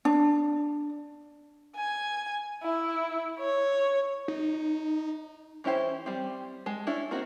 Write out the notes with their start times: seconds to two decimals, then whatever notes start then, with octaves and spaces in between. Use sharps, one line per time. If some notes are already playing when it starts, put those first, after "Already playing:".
0.05 D4
1.76 G#5
2.63 E4
3.40 C#5
4.28 D#4
5.64 E3 C#4 E4 G4 C5
6.06 G3 C4
6.66 G#3 A5
6.87 C#4 D4 E4
7.11 A#3 C4 D#4 F#4